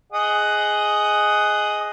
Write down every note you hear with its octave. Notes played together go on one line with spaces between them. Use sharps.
G#4 D#5 F#5